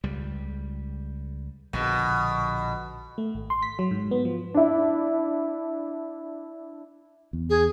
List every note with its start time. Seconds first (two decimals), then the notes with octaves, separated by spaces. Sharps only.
0.04 C#2 G3
1.73 A#1 B2 D3
3.18 A3
3.35 G#1
3.50 C6
3.63 B6
3.79 F#3
3.91 G#2
4.11 B3
4.25 F3
4.54 D4 E4
7.33 E2
7.50 G#4